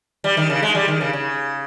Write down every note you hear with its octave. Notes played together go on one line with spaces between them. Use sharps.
G3
D#3
C#3
G#3
G3
D#3
C#3
C#3